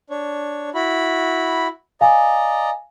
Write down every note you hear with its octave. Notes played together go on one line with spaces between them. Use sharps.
D4 C#5
E4 F#4 B5
D5 D#5 F5 G#5 A#5